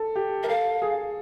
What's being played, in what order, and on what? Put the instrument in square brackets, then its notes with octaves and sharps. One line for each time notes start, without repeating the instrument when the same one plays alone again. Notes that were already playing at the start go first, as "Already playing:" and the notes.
Already playing: [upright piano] A4
G4
[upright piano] A#4 [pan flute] E5
[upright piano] A4 [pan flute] F5
[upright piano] G#4